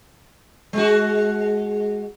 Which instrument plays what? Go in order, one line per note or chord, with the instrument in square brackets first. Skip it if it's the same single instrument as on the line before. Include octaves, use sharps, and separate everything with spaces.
[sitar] G#3 F#4